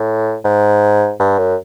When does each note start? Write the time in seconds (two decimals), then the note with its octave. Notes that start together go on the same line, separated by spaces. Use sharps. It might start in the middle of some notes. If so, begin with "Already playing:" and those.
Already playing: A2
0.44 G#2
1.20 G2
1.38 F#2